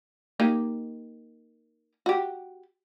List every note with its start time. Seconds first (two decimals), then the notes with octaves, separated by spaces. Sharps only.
0.40 A#3 D#4 G4
2.06 F#4 G4